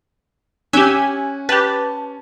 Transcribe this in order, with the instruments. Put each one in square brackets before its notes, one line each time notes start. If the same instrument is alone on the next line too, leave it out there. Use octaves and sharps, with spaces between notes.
[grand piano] C#4 [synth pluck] G4 E5 [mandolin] F#5 G#5
[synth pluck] G4 B4 [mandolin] A5